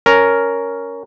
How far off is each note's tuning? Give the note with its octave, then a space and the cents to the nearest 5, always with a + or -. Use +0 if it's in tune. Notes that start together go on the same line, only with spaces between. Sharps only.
C#4 +10 A#4 +0